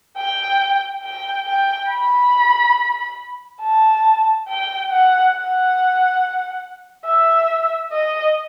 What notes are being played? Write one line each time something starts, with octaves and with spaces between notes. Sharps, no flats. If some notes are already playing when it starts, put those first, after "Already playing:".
G5
G5
G5
B5
A5
G5
F#5
F#5
E5
D#5